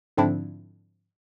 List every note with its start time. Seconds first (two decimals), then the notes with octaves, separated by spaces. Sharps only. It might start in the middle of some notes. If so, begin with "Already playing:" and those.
0.17 G#2 D3 F3 C4 D4 E4